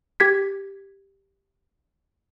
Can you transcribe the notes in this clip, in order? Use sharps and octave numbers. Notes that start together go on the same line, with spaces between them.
G4 G#6 B6